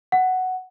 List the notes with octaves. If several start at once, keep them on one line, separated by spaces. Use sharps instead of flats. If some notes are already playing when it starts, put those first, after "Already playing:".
F#5